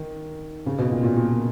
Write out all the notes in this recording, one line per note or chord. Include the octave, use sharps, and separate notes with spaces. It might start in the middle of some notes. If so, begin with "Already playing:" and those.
Already playing: D#3
C#3
B2
A#2
A#2
A#2